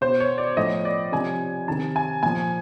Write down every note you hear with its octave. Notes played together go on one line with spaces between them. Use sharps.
B2 C5
C#5
D5
A2 F3 D#5
D5
C3 F3 G#5
C3 D#3 A5
G#5
A#2 F3 G#5